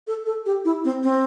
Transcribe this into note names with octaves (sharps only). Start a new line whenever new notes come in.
A4
A4
G4
E4
C4
C4